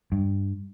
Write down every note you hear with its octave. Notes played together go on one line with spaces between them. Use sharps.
G2